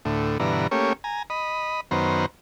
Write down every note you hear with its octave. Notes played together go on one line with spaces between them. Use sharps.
D2 A2
G2 B2 D3 E3 A#5
A3 A#3 C#4 G4 C#5
G#5 A#5
D#5 B5
F#2 D#3 B3 C5 A#5